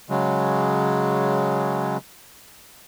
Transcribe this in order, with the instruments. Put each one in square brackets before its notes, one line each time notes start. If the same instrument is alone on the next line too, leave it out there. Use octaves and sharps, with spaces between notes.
[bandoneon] C#3 F#3 G#3